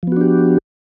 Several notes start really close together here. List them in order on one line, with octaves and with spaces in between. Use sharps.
F3 B3 F#4 D4 G4